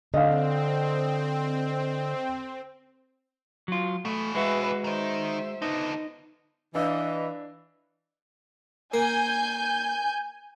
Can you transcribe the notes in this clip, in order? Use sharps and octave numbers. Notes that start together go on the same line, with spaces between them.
D3 C4 D#5 F5
F#3 F4
B2 E3 A3
G#3 F#4 B4 E5
D#3 D#4 C5 E5
D3 B3 D#4
E3 D4 B4 D#5 F5 E6
A#3 G#5 G6